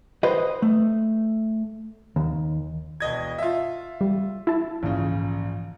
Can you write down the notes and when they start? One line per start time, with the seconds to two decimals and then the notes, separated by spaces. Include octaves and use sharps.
0.23 B4 C5 D#5
0.62 A3
2.16 D#2
3.00 E1 D#5 G#6
3.38 F4 E5
4.01 G3
4.47 E4 A5
4.83 A#1 G#2 C#3 E3 F3